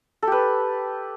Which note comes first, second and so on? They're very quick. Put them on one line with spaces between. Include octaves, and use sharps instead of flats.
A4 G4 B4